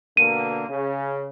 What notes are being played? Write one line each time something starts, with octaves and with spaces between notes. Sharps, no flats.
B2 D3 A#3 D#7
C#3